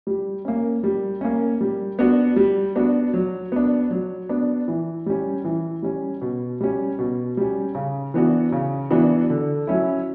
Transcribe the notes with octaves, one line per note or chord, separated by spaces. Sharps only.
G3
A#3 C#4
G3
A#3 C#4
G3
B3 D4 F#4
G3
B3 D4 F#4
F#3
B3 D4
F#3
B3 D4
E3
G3 C#4
E3
G3 C#4
B2
G3 C#4
B2
G3 C#4
C#3
E3 B3 D4 F#4
C#3
E3 B3 D4 F#4
D3
F#3 C#4 E4